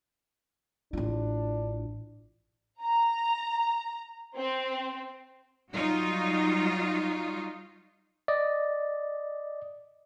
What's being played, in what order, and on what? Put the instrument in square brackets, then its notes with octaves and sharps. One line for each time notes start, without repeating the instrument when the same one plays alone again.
[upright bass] A1 F4 [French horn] D4
[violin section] A#5
C4
[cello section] F#3 G3 D#4 F4 F#4
[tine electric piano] D5 D#5